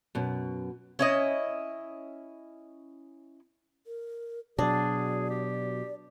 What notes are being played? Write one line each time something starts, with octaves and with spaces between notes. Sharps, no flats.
F#2 B2
C#4 E4 D#5
A#4
B2 F#3 D4 G#4 D5
G4